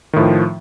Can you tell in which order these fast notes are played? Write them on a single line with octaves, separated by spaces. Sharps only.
D#3 A2 F3